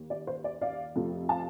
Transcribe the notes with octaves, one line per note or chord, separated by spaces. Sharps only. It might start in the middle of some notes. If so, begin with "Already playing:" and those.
Already playing: D#2
D5
C5
D5
D5 F5
F2 C3 F3 A3
F5 A5